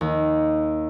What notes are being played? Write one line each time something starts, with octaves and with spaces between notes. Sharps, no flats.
D#2